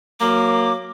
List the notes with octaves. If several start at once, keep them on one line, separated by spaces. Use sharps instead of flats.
F#3 A#3 D6